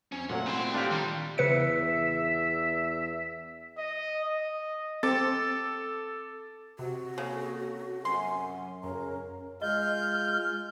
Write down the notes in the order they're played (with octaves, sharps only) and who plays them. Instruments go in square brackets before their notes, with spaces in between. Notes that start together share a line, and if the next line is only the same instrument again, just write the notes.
[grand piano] F2 [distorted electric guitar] C#4
[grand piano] A#2 F#3 A3 [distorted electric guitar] F#5
[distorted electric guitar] C2 E4 [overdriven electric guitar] C4 C6
[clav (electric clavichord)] D4 F4 G4
[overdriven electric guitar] D#3 [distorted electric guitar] G3
[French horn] E2 [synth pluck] C#3 B4 C#7 [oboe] E5
[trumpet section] D#5
D#5
[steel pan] C4 [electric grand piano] A4 D6 [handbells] A6
[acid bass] C3 [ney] F#4
[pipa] C#3 [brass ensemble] A#3 A4
[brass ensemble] F#2 [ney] G#5 [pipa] C6
[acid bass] F#2 [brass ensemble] C#3 C#4 A#5 [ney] A#4
[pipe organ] G#3 F4 G6 [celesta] D#5 [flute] F6